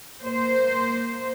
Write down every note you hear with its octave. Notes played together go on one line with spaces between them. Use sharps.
A#3 C5